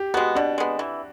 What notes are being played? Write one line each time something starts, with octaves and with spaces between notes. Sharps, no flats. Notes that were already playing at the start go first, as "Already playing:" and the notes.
Already playing: G4
G#3 B3 F#4
B2 D4
G#3 B3
E3